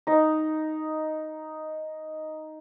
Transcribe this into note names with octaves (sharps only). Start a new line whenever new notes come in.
D#4 D#5